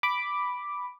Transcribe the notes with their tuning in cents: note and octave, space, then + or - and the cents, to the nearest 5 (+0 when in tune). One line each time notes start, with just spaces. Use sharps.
B5 +0 D6 +0